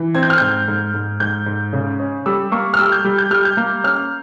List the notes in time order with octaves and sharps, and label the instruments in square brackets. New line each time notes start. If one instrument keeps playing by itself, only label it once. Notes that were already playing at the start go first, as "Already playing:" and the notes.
Already playing: [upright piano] E3
C4 G#6
G6
F6
G#2 G6
G#2
G#2
G#2 G6
G#2
C#3
C#4
G3 E6
A#3 C#6
F6
G3 E6
G6
G3
G6
G3 F6
G6
A#3
C#4 F6